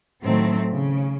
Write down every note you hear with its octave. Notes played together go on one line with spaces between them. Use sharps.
A2 D#3 F#3 A3 C4
C#3